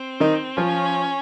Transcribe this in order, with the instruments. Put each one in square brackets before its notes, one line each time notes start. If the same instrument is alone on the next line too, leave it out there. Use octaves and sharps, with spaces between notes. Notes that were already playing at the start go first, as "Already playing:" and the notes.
Already playing: [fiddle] C4
[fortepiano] D#3 D#4
[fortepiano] F3 F4 [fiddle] C#4